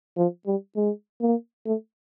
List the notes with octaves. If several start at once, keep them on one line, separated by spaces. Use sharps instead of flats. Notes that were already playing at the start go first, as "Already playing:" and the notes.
F3
G3
G#3
A#3
A3